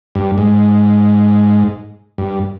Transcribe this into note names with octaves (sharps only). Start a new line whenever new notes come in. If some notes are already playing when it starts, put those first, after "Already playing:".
G2
G#2
G2